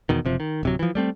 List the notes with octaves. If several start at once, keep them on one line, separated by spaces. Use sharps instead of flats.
E2 B2 D#3
F#1 C3 F3
D#3
D1 C3 F#3
E3 F3
G3 A3 C4